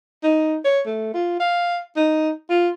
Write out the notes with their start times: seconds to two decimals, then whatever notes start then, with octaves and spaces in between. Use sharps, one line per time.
0.23 D#4
0.65 C#5
0.86 A3
1.14 F4
1.40 F5
1.96 D#4
2.50 F4